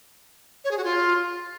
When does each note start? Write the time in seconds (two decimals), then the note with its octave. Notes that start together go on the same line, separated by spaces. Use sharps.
0.64 C#5
0.71 G#4
0.78 F#4
0.84 F4